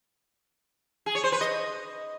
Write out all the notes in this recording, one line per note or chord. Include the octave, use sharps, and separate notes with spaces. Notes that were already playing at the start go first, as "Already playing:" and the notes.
G#4
C#5
C5
B4
D#5